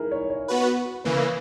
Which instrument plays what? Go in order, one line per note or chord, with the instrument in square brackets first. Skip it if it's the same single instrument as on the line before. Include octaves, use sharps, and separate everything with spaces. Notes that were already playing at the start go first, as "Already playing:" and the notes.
Already playing: [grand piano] D#4 E4 G#4 A#4
C#5
C#5
[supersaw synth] B3 F#4 B4
[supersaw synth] C#3 E3 A#3 [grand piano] B4